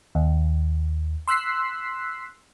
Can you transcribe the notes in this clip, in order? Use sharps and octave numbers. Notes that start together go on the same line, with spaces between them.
D#2
C6 E6 F#6 B6 C7